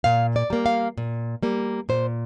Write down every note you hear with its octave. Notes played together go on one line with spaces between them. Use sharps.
A#2 F5
D5
G3 A#3
F5
A#2
G3 A#3
A#2 C5